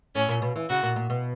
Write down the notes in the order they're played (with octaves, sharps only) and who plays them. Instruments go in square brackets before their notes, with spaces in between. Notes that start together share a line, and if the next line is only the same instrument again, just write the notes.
[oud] A2 [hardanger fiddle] C#4
[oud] A#2
B2
E3
[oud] C#3 [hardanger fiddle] F#4
[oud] A#2
A#2
B2